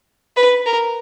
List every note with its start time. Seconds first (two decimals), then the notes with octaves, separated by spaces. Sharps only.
0.37 B4
0.66 A#4